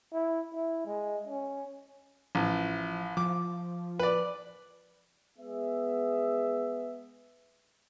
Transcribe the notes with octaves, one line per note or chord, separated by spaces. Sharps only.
E4
E4
G#3
C#4
A1 F3
F3 D6
B4 D5
G#3 B3 G#4 E5